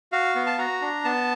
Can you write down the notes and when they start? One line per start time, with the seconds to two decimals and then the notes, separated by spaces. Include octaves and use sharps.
0.12 F#4 F5
0.35 B3
0.47 A5
0.58 F#4 A#5
0.81 D4
1.05 B3 A5